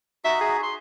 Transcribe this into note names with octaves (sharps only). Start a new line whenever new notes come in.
D#4 F#4 E5
G#4
C6